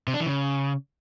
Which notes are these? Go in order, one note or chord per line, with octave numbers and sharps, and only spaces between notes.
C3
D4
E3
C#3